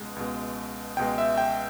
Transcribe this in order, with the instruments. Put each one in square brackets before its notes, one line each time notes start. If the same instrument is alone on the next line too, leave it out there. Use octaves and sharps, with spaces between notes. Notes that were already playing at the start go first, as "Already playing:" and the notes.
Already playing: [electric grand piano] C#2 B2 G#3
C#2 B2 G#3
C#2 B2 G#3 G5
E5
G5